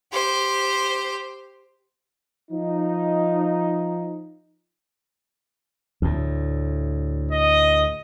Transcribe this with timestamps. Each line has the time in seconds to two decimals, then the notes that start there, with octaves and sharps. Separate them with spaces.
0.12 G4 C5
2.51 F3 D#4
6.02 D2 A2
7.31 D#5